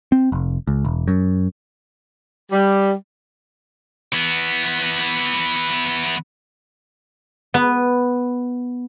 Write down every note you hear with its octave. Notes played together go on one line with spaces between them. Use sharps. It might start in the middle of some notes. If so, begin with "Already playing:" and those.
C4
F1
C#2
E1
F#2
G3
E3 B3
B3